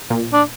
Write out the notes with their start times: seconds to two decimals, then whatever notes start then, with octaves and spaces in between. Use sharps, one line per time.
0.10 A#2
0.33 D4